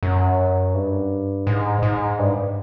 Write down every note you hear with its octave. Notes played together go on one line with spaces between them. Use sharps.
F#2
G2
G#2
G#2
G2